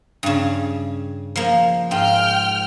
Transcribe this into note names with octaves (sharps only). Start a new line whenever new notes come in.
G2 C#3
F3 A#3
G#2 F4 G5 F6